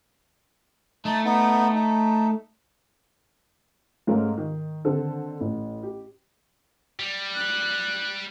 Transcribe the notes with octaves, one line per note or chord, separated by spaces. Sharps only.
A3 D#4 A5
B3 D#4
D#4
G#2 A3 C#4 F4 A#4 F5
D#3
D3 D#3 C4 A4
A1
G4
G3
F#6